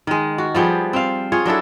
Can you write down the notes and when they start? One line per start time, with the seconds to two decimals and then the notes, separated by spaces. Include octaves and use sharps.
0.07 D#3 G#3
0.38 F#4
0.55 F3 G3 B3 G#4
0.93 C4 F5
1.32 F4 G#4 C#5
1.45 F#3 D4 E4 A4